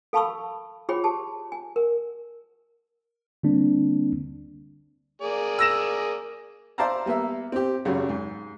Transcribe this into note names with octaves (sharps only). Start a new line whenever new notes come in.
A4 F5 A5 B5 C#6 E6
F4 G#4 C5 C#5 G5 B5
G4 G#4 A5
G#5
A#4
D3 G3 A#3 C4 D4
A#3 G#4 D5
E6 A#6 E7
C5 D5 E5 F5 A5 A#5
G3 A#3 B3 E5
C4 G4
G#1 F#2 C#3 F#4 G4
G#2